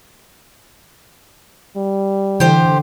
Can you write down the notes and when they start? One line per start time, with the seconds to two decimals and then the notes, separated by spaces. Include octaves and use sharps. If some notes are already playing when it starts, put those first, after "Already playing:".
1.76 G3
2.40 D3 E3 G4 C5